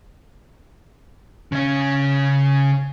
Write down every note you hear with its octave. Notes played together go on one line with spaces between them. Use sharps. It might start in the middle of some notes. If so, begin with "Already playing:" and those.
C#3 C#4